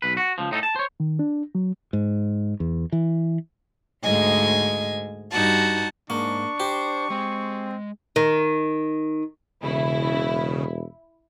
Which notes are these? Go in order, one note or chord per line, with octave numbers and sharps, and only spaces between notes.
B1 B4
F#4
C#2 F3
A2 D#4 E4 A4
A5
C5 C#5
D#3
D4
F#3
G#2
E2
E3
D2 G#2 D#5 G#5
G2 D#4 F#4 A5
G#2 A#3 D4 C#6
G4 C5
G#3 C4
D#3
E1 C#3 E4